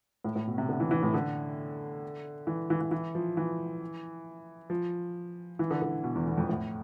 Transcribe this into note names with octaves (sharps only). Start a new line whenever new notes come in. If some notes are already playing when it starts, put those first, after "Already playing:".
A2
A2
B2
C3
D3
E3
E3
A2
D3
E3
E3
E3
E3
F3
E3
F3
E3
D3
D3
B2
E2
E2
F2
A2